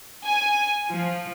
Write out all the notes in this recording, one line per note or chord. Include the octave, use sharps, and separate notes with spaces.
G#5
F3